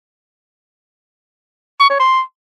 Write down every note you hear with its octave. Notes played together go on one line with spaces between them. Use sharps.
C#6
C#5
C6